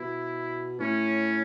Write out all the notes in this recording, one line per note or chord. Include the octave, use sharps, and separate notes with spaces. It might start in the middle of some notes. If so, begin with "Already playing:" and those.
Already playing: B2 E4
A2 C#4